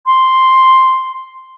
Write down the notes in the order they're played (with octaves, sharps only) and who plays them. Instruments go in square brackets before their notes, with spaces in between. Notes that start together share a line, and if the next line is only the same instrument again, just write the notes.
[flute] C6